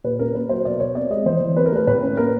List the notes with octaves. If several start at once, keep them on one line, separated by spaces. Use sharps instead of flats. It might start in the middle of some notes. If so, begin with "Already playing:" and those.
A#2 B4
C#4 A#4
A#3 B4
F#3 C5
B2 D5
B2 C#5
C4 D5
G#3 D#5
E3 C5
E3
C4 B4
A#4
A3 B4
A2 B4
C#4
A#3 A#4